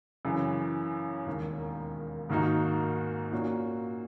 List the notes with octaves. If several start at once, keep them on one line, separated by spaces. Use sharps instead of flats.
F#2 C#3 E3
E1 D#2 D#3
G#2 D#3 A#3 D#4 F#4
A#2 A#3 C#4 F#4